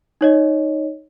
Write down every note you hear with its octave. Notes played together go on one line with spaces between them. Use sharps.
D#4 C#5 D#5